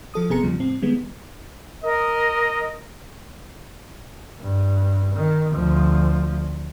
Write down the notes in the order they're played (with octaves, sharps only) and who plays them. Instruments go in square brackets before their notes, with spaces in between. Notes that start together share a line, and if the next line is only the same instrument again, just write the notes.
[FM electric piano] F3 A4 D#6
G1 C3 B3 G#4 A#5 C#7
E2 C#3 F3 G3
A2 C4
D#3 G3 G#3 B3
[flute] A#4 [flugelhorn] D#5
[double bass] G2
D#3
D2 F3